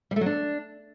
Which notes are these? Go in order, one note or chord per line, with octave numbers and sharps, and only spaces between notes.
G3
A3
F#3
D4